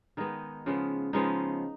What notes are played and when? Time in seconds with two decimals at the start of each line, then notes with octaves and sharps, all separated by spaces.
0.17 D#3 G#3 B3 D#4
0.66 C#3 F3 G#3 B3
1.13 C#3 F3 G#3 B3 D#4